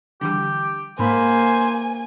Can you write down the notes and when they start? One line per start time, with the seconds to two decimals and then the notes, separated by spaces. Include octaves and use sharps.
0.21 D3 E3 G3 G4
0.99 G#2 A#3 C5 G#5 B5